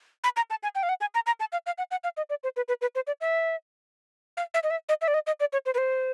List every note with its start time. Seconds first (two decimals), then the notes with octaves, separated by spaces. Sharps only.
0.24 B5
0.36 A#5
0.50 A5
0.63 G#5
0.75 G5
0.83 F5
0.89 F#5
1.01 G#5
1.15 A#5
1.26 A#5
1.40 A5
1.52 F5
1.66 F5
1.78 F#5
1.91 F#5
2.04 F5
2.17 D#5
2.30 D5
2.44 C5
2.57 B4
2.68 B4
2.82 B4
2.95 C5
3.07 D5
3.21 E5
4.37 F5
4.54 E5
4.63 D#5
4.70 E5
4.89 D#5
5.01 E5
5.08 D5
5.14 D#5
5.27 D#5
5.40 D5
5.53 C#5
5.66 C5
5.75 B4
5.78 C5